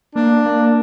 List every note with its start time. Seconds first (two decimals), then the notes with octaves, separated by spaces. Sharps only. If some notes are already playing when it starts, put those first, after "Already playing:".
0.15 A#3 D4
0.46 A#3